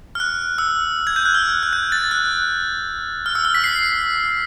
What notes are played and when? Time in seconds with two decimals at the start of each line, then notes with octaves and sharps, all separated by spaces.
0.15 F6
0.20 F#6
0.58 E6
1.07 G#6
1.16 G6
1.25 F#6
1.35 F6
1.63 F#6
1.73 G6
1.92 A6
2.11 F#6
3.26 F6
3.35 E6
3.45 F6
3.55 B6
3.64 C7